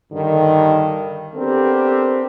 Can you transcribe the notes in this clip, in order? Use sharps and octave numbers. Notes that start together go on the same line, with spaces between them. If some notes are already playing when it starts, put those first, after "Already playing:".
G2 D3 D#3
B3 C4 D4 G4 A4 A#4